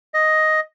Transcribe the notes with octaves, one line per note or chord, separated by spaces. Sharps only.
D#5